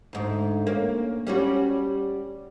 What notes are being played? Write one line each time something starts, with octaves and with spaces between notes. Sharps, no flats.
D2 G#2
A#3 C#4
G3 C#4 F#4